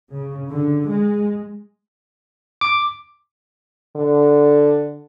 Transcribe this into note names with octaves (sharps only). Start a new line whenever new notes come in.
C#3
D3
G#3
D6
D3